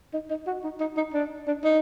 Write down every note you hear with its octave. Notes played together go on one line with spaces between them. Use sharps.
D#4
D#4
F#4
D#4
D#4
D#4
D4
D4
D#4